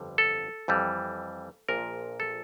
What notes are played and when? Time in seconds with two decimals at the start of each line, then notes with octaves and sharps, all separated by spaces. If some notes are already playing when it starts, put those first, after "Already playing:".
Already playing: G1 F2 D3 G3
0.18 A4
0.68 F2 E3 G3
1.69 A#1 A#2 F3 A#4
2.20 A4